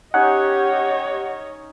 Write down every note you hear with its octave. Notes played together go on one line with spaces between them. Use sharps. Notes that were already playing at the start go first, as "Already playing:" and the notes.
C#4 D#4 G4 C#5 D#5 F#5